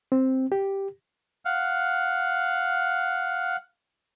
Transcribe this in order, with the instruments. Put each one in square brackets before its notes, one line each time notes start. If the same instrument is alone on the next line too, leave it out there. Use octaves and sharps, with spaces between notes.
[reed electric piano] C4
G4
[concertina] F5 F#5